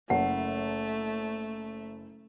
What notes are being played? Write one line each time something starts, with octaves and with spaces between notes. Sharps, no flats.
F#1 A3 F#5